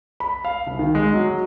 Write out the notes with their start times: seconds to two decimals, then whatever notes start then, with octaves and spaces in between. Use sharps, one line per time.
0.20 B5
0.45 F5
0.67 C2
0.79 D#3
0.95 G#3
1.14 F#3